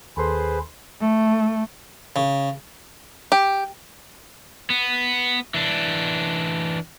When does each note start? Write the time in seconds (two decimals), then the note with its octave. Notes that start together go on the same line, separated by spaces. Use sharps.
0.17 D#2 G#4 A4 B4 C5 C6
0.99 A3
2.16 C#3
3.32 G4
4.70 B3
5.54 E3 D4